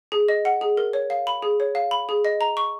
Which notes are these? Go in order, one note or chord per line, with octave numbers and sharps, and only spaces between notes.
G#4
D#5
F#5
G#4
A#4
C#5
F5
B5
G#4
C#5
F5
B5
G#4
D#5
A#5
C#6